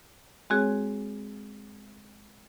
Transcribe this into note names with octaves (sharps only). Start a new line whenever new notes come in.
G#3 C4 F#4 G#4 C#5